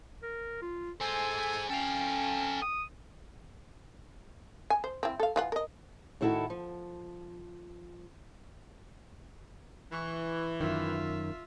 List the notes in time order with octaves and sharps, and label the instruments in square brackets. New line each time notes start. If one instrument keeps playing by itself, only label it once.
[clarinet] A#4
F4
[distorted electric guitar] G#3 C5 [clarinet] A4 [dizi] G#5
[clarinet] C#4 [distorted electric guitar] A4 F5 [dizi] G5
[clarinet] D#6
[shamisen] G#5
C5
C4 E4
A4 F5
E3 F4 F#5
A#4 D#5
[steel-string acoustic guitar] A2 D#3 E4 F#4 A4
F3
[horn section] E3 [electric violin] C#6
[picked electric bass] F#2 D#3 [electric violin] F4 E5